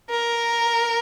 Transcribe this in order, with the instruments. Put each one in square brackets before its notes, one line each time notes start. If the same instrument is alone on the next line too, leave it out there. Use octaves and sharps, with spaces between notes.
[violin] A#4